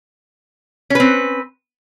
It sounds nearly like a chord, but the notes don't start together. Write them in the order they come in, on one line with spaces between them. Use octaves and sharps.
C#4 B4 C4